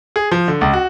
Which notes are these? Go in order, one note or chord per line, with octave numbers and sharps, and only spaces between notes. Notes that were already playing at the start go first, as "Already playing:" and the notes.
G#4
F3
D3
C#2
F#4